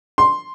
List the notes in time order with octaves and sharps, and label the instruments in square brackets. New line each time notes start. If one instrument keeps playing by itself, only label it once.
[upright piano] C6